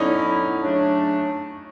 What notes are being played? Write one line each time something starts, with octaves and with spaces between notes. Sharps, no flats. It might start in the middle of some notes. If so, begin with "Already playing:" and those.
Already playing: D3 F#3 B3 C#4 D#4 E4
C#3 F#3 A3 D4